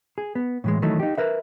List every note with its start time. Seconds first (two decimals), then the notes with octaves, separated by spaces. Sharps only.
0.18 G#4
0.35 B3
0.64 A2 E3 G#3
0.82 D#3 E3 F#3 A3 D#4
1.00 D#4 G4
1.18 A#4 B4 E5